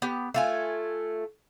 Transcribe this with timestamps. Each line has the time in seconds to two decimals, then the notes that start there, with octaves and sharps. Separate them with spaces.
0.02 B3 G4
0.34 A3 F4 G#5